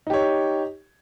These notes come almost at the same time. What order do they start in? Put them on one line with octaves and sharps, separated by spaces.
D#4 G4 C#5